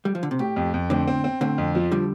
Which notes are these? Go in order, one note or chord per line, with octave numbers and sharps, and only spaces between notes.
G3
F3
D3
C3
A2 G4
F2
F2
A2 D3 C4
C4
C4
A2 D3 C4
F2
F3
D3 G3